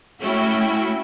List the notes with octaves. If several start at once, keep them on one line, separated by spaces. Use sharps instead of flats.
A3 C#4 E4 F#4 G5